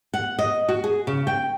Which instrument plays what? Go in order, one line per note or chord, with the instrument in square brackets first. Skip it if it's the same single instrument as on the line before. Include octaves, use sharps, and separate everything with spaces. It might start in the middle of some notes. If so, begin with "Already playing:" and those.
[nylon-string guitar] F#5
D#5
F#4
G#4
C#3
G5